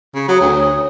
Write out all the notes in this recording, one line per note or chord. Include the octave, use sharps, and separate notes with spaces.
C#3
F#3 C#5 D#6
D2